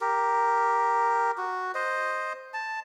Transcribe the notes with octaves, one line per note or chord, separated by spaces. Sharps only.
G4 A#4
F#4
C5 D#5
A5